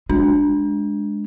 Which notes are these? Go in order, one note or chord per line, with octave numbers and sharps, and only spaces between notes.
G#3 D4